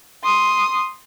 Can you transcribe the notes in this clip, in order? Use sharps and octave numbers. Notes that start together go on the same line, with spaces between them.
C6 D#6